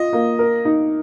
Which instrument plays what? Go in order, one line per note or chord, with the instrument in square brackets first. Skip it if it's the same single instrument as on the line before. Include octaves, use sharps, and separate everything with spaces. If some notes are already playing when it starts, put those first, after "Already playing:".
Already playing: [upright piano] F4 [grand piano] D#5
[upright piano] A#3
A#4
D#4